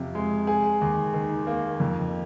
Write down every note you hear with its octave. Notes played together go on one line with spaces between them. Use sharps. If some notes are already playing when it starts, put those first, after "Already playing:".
Already playing: F2 C3 F4
G#3
G#4
D#2
D#3
A#3
F2